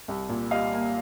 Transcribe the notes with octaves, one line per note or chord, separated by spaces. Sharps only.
C2
A#2
G3 D#5 F5
A#3